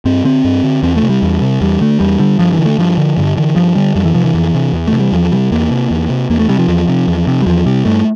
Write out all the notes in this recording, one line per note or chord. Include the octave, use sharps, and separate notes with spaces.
G2 C4
D3 C4
G2
D3
E2 C4
A3
C3
G3
E2
C3
E2 G3
D3 A3
E2 G3
D3 G3
G2 F3
E3
D3
A3
G2 F3
D3
G2 D3
D3 E3
G2 F3
D3 G3
F2 G3
E3
C3 F3
E3
F2
C3
E2
A3
C3
G3
E2 F3
C3 G3
E2 A#3
C3
E2
C3
E2 A#3
A3
C3 G3
F3
E2
C3
E2
C3
G3
E2 F3
C3 G3
G2 A3